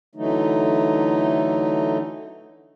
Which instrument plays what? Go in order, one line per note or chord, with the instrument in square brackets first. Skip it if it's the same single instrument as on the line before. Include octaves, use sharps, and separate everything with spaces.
[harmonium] D3 E3 F#3 A3 D#4